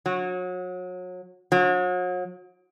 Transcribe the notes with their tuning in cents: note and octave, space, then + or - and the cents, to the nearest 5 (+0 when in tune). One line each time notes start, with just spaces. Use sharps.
F#3 -30
F#3 -40